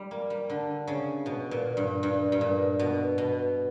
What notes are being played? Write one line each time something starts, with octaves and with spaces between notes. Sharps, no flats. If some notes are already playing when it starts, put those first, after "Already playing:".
Already playing: G3
A#3
G3
D3
C#3
B2
A#2
G2
G2
G2
A#2
B2
B2